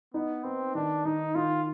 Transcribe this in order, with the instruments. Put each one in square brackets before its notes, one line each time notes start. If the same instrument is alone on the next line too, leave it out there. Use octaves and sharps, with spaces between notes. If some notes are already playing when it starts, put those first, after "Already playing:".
[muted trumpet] B3 [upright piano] D#4
[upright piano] B3 [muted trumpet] C4
[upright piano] D#3 [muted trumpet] D4
[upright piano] D#3 [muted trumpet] D#4
[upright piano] D#3 [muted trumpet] F4